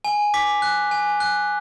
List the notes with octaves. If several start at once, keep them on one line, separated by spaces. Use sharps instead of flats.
G#5
D6 B6
F#6
G#5
F#6